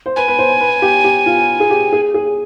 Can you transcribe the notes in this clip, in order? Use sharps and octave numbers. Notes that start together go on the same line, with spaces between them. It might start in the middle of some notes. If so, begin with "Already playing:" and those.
C5
B4 G#5
B4
C5
B4
G4
G4
F4
G#4
G4
G#4
G#4